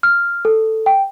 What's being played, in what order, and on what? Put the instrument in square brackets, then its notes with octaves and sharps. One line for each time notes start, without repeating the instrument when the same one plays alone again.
[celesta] F6
A4
G5